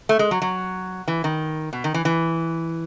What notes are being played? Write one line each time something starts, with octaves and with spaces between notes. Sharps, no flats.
A3
G#3
F#3
F#3
E3
D#3
B2
D#3
E3
E3